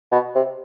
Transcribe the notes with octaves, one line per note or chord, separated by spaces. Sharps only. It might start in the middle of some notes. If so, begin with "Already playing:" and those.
B2
C3